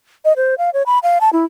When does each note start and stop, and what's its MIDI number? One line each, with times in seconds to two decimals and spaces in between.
0.25 0.33 75
0.37 0.55 72
0.58 0.70 77
0.74 0.83 73
0.86 0.99 83
1.03 1.18 77
1.21 1.30 81
1.33 1.45 64